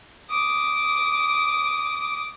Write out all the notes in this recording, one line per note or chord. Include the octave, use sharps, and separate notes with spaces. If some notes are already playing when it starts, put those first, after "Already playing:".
D6 D#6